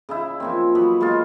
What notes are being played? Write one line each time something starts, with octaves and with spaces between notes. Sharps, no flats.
C#3 D#4 E4
F3 A#3 C4
F#3 B3 B5
G#3 A#3 C#4 F4